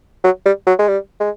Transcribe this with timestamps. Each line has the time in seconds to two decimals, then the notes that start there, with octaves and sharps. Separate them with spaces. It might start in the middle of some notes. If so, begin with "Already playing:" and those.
0.24 F#3
0.45 G3
0.67 F#3
0.79 G#3
0.88 G3
1.20 G#3